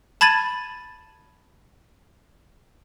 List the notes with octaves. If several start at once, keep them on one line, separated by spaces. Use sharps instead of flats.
A5 B5 G#6 A6 D#7